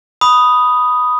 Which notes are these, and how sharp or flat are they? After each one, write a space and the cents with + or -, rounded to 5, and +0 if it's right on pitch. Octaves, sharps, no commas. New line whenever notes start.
B5 +0 D#6 +0